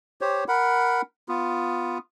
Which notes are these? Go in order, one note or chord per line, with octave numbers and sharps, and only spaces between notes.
G4 C5 C#5
A#4 F#5 B5
B3 F4